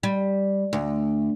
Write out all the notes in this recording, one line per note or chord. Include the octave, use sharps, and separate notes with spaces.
G3
D2